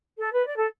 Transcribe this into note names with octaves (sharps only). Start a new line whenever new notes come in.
A4
B4
D5
A4